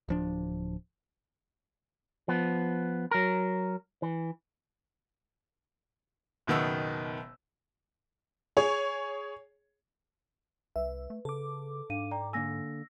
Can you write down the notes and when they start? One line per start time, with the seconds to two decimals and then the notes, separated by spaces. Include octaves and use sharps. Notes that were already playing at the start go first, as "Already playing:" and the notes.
0.09 D1 F3 D4
2.28 F3 B3
3.11 F#3 A#4
4.02 E3
6.47 F#1 B2 D#3 B3 E6
8.57 G#4 C#5
10.76 C2 B4 E5
11.10 A3
11.25 C#3 A4 D6
11.90 G#2 D4 F5 D#7
12.11 D5 G5 A#5
12.33 D3 A#3 G#5 E6 A#6